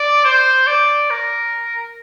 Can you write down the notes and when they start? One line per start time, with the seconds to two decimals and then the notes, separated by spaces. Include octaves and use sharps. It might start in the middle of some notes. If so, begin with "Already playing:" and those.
Already playing: D5
0.24 C5
0.67 D5
1.10 A#4